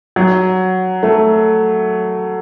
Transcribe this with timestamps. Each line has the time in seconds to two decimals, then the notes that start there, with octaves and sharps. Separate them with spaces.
0.16 F#3
1.03 A3